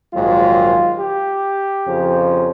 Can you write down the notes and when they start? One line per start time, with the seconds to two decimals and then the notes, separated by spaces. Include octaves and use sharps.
0.13 A#1 G#2 D#3 F#3 F4
0.99 G4
1.86 F2 C#3 F3